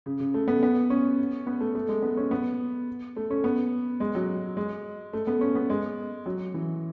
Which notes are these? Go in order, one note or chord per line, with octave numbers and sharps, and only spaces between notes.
C#3
C#3
A3
B3
B3
C#4
B3
A3
A3
G#3
B3
C#4
B3
A3
C#4
B3
G#3
F#3
G#3
A3
B3
C#4
B3
G#3
F#3
E3